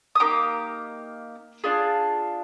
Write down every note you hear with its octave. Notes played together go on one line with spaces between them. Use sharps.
D#6
A#3 D#4 G4 D6
D4 F4 G#4